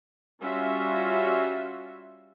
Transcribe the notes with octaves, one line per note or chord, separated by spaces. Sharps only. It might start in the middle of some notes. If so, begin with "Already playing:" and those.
G3 C#4 F4 F#4 E5